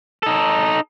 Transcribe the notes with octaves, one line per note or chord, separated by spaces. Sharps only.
D#4 A4